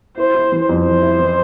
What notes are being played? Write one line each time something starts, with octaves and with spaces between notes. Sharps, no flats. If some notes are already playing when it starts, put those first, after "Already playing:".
E4 C5
E4
E3
F2
E3 C5
E4
E3